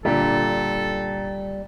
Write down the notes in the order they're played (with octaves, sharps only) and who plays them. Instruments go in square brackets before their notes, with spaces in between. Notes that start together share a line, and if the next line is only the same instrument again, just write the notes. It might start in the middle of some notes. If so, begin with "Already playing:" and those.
[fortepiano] A#2 D3 [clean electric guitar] G3 [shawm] A4